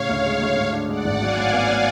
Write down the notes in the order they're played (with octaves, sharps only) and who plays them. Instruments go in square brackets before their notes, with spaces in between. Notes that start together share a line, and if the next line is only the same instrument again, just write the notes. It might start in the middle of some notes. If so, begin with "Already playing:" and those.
Already playing: [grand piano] A2 C#3 [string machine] C#5 F5
[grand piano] D2
G#3
D2
[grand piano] G#2 [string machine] C#5 F5
[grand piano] D4
[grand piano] G#3 [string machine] D5 F#5
[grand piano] G#1
[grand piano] F#3 [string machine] F5 G#5
[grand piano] A2
[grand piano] B3 [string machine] D5 F#5
[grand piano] A2